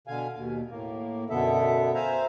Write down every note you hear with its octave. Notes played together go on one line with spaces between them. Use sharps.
B2 D3 F5 G#5
D#2 B2
A2 A#3
F#2 B2 D3 B3 A4 E5
C5 E5 F5 G#5 A#5